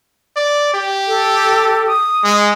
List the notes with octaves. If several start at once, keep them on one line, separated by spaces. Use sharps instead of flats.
D5
G4
A4
D#6
G#3